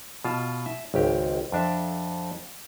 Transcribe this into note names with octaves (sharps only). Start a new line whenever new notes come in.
B2 F4 A5
E5
G#1 C#2 G4
F2 D4 E5